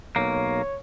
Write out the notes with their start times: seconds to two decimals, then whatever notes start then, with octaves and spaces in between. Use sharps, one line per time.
0.16 B1 A#3 C#5